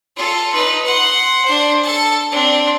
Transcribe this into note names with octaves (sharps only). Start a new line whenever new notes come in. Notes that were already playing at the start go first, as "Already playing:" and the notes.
F4 A4
D#4 B4
F#5 C6
D4 C5
A4 A5
C4 D4